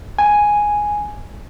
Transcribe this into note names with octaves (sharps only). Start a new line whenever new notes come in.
G#5